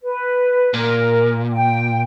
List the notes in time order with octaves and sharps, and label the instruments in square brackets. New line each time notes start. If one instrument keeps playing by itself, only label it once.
[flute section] B4
[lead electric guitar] A#2 [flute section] A#4
[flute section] G5